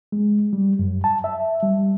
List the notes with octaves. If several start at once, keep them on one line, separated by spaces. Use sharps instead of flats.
G#3
G3
F#2
A5
E5
G3